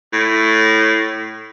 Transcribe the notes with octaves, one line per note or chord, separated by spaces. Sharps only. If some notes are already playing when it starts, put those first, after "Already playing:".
A2